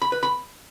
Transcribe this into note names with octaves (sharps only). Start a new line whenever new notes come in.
B5
B4
B5